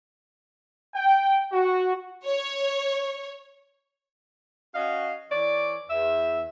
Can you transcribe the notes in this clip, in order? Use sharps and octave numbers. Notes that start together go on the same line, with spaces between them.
G5
F#4
C#5
C#4 F#4 D#5 F5
E3 C#5 D5
E2 E5